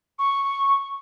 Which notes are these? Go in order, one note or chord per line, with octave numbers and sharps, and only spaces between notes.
C#6